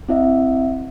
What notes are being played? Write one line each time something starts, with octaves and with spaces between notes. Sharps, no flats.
C4 E4 D#5 E5